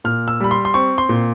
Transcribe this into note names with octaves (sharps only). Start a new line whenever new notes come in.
A#2 F6
E6
G3 B5
C6
C6
C4 C#6
C6
A#2